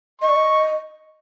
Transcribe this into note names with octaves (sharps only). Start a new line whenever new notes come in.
D#5 C#6
D5
D#5